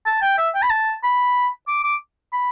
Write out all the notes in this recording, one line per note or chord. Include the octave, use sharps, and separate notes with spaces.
A5
G5
E5
G5
B5
A5
B5
D6
D6
B5